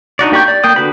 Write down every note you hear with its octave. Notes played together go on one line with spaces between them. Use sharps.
D4 D#4 F#4 D5
A#3 G4 D5 C#6 G6
D5
A#3 G5 D#6
D3 F#4 B4 B5